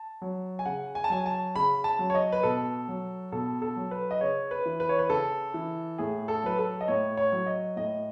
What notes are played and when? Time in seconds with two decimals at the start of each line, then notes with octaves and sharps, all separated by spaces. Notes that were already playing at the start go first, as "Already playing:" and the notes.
Already playing: A5
0.22 F#3
0.59 G#5
0.66 C#3 F#5
0.95 G#5
1.04 A5
1.10 F#3 G#5
1.26 A5
1.56 C#3 B5
1.84 A5
1.99 F#3
2.10 C#5
2.15 D#5
2.32 B4
2.43 B2 A4
2.88 F#3
3.32 B2 A4
3.62 A4
3.76 F#3
3.91 B4
4.11 D#5
4.21 C#3 C#5
4.51 B4
4.66 E3
4.80 B4
4.89 C#5
4.99 B4
5.10 C#3 A4
5.54 E3
5.98 A2 G#4
6.28 A4
6.44 F#3 B4
6.59 A4
6.81 D#5
6.88 A2 C#5
7.17 C#5
7.32 F#3
7.46 D#5
7.76 A2 D#5